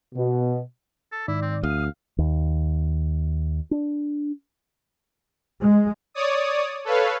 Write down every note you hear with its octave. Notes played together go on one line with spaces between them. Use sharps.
B2
A4
G#2 D#3 E4 D5
C4
D2 F5 D#6
D#2
D4
G#3
C#5 D5 D#6
A4 B4 C#5 F5